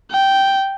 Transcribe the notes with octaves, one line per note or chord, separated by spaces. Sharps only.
G5